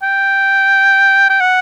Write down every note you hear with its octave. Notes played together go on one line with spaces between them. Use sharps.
G5
G5
F#5